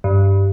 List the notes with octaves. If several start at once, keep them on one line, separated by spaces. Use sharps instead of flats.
G2